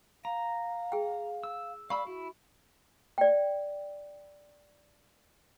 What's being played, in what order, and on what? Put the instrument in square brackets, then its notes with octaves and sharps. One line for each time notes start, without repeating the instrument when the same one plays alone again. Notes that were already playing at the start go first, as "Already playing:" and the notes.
[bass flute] F5 [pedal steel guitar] A#5
[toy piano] G#4 G5
[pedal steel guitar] E6
[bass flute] D5 [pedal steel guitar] F5 B5 E6 [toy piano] C#6
[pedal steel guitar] E4 [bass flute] F#4
[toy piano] D5 G5